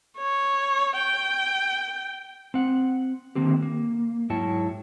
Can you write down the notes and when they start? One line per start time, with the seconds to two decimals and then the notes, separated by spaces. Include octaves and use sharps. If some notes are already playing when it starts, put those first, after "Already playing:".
0.18 C#5
0.97 G5
2.54 C4 F#5
3.35 D3 D#3 A#3 C4 G4
3.62 A#3
4.30 G#2 F#3 E4 C#5 G5 A5